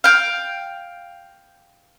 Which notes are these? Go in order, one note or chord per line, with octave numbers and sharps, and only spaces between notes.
F5 G5